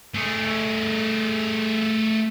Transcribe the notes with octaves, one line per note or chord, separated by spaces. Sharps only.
A3 G#4